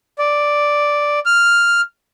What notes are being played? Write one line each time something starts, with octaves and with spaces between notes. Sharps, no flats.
D5
F6